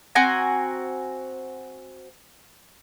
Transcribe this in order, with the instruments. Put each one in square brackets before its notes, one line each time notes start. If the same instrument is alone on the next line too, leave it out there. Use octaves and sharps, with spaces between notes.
[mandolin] C4 F#4 G#5 A#5